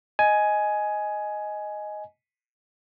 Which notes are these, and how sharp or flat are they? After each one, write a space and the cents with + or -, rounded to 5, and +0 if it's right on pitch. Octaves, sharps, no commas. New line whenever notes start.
D#5 +0 G#5 +10